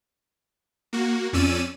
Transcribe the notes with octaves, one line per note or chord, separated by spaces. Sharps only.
A#3 F#4
F2 C#4 D5 E6 D#7